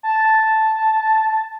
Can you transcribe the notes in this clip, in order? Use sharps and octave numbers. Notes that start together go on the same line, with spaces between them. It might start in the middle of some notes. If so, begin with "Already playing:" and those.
A5